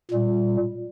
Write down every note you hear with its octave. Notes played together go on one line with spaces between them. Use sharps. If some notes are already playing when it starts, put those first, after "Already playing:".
A#2 G3